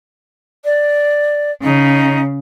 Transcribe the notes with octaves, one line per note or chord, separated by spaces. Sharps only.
D5
C#3 D#4